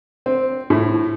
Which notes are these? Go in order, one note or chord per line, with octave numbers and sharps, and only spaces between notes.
C4
A2